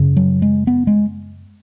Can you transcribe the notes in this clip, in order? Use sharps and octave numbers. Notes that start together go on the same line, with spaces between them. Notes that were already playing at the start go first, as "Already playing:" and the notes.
Already playing: F#2 C#3
F#3
G#3
B3
G#3